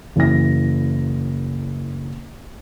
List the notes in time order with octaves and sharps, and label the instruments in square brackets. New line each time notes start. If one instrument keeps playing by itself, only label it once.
[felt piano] F#1 E3 A#6